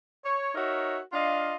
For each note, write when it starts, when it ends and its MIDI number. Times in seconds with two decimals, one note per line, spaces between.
0.24 0.51 73
0.55 1.00 63
0.55 1.00 66
0.55 1.00 70
0.55 1.00 73
0.55 1.00 76
1.13 1.56 62
1.13 1.56 65
1.13 1.56 75
1.13 1.56 77